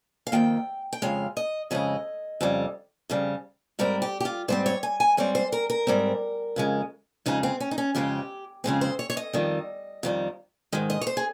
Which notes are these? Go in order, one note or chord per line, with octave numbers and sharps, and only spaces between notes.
F5
F2 D#3 A#3 G5
G5
F2 C#3 G#3 F5
D#5
F2 C#3 G#3 D#5
F2 C#3 G3
F2 C#3 G3
G#2 G3 C4 A#4
G4
G4
F4
G#2 G3 C4 C5
C#5
G#5
G#5
G#2 G3 C4 C#5
C5
A#4
A#4
G#2 G3 C4
F2 C#3 G#3
F2 C#3 G#3 D#4
C4
C#4
D#4
C#4
F2 C#3 G#3 C4 G4
F2 C#3 G#3 C4 G#4
C5
C#5
C#5
D#5
F2 D#3 G3
F2 D#3 G3
G#2 D#3 G#3
D#5
C#5
C5
G#4